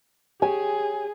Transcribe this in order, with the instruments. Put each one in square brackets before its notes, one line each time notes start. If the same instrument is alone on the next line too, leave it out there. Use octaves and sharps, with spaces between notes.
[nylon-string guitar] G4 C#5 [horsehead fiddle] G#4 [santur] G#5